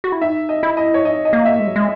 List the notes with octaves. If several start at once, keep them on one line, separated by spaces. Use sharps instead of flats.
F#4
E4
D#4 E5
D#5
E4
D#5
C#5
D#4 D#5
D#5
A#3
E5
G#3
F#3
G#3